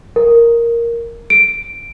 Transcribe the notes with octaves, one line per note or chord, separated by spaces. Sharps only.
A#4
D7